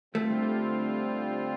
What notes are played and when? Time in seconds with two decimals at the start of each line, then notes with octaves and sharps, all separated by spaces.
0.14 D3 G3 A3 C4 F4